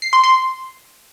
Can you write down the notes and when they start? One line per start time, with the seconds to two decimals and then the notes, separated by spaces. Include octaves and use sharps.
0.02 C7
0.13 C6
0.24 C6